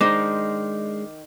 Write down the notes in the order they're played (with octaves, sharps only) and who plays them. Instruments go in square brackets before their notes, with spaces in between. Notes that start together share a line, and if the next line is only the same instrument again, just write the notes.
[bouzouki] D#3 [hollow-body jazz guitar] G#3 D4 [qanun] D#4 C5 D#5 [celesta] D6